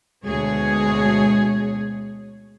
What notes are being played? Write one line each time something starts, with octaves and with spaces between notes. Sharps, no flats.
D2 B2 G#3 G#4 C#5